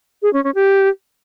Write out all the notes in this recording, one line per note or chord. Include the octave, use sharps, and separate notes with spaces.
G#4
C#4
C#4
G4